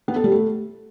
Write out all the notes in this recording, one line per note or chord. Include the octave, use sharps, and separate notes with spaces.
B3
A4
G3
A3